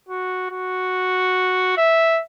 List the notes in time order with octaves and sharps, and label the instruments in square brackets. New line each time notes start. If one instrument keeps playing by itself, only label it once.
[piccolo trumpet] F#4
F#4
E5